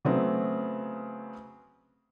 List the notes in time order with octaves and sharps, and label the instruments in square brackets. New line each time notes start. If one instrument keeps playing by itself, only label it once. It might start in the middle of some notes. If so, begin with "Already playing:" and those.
[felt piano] C#3 F#3 A3 B3 C4